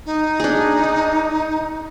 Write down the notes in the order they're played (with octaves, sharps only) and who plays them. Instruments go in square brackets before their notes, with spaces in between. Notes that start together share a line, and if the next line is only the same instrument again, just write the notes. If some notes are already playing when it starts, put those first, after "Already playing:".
[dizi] D#4
[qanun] D4 G#4